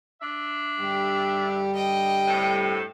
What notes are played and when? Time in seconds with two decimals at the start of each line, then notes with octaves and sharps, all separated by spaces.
0.21 D4 E5
0.81 G2 D3 G3 G4
1.75 D#5 G5
2.27 A2 C3 A4